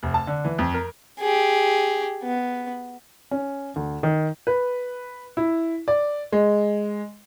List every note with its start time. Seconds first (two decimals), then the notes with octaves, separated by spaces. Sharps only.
0.03 F1
0.14 A5
0.27 D3
0.45 E3
0.58 F2
0.74 A#4
1.20 G4 G#4
2.23 B3
3.31 C#4
3.76 D2
4.03 D#3
4.47 B4
5.37 E4
5.88 D5
6.32 G#3